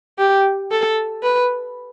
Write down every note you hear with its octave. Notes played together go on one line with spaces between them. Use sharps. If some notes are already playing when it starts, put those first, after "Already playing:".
G4
A4
B4